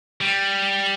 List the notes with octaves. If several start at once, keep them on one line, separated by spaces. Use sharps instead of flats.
G3